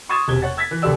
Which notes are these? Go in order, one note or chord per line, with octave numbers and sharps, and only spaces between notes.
C6 C#6 D#6 G#6 A6 E7
E1 C3 G#6 G7
C#5 F#5 A6
E6 G#6 A6 B6
E3
F1 D#2 G4 A4 D5 E6